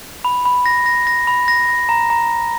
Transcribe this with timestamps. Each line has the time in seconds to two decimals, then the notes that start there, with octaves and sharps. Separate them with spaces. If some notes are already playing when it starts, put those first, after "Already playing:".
0.25 B5
0.45 B5
0.66 A#6
0.86 A#6
1.07 A#6
1.27 B5
1.48 A#6
1.68 A#6
1.89 A#5
2.10 A#5